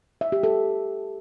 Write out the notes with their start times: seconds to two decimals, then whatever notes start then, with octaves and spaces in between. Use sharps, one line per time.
0.21 E5
0.32 G4
0.43 A4